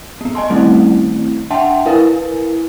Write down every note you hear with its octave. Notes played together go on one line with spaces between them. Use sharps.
A#3 B3
D#5 G#5 A5 C6
D#3 G3 A3 C4 C#4 E4
D4 E5 F#5 G5 A5 C6
E4 A#4 B4 F5 G#5